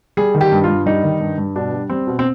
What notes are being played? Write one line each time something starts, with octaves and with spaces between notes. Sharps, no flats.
G3 G#4
D#3
G4
G2
G2 F4
G3 D#4
D#3
G2
G2
B2 D4
G3
G3 C4
B2
C4